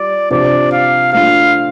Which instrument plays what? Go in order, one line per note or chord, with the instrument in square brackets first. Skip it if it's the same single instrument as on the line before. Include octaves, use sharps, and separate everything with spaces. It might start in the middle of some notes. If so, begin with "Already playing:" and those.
Already playing: [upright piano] G3 F4 [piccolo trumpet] D5
[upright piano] C3 F3 D4 [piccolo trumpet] D5
[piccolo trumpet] F5
[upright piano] F3 A3 D4 F4 [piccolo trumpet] F5